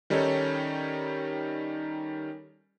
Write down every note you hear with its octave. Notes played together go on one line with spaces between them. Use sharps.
D#3 G3 C#4 D#4 A4 C#5